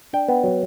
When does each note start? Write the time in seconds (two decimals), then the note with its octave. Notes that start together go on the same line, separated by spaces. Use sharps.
0.13 D4 G5
0.29 B3
0.44 F#3